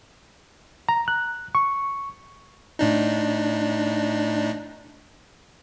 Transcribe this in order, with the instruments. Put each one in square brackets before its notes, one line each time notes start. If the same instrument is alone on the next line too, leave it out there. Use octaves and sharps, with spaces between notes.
[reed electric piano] A#5
F#6
C#6
[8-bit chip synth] A2 D4 D#4